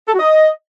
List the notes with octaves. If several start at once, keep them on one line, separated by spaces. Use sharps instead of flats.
A4
F#4
D#5